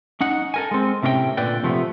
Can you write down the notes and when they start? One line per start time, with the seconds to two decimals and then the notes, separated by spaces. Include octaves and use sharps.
0.21 C#4 D#4 F#5
0.54 A4 A#4 G#5
0.71 G#3 C4
1.03 A2 C3 C#4 A#4 C#5 G5
1.37 A#2 D3 B4 D5 G5
1.63 C3 F3 A3 B3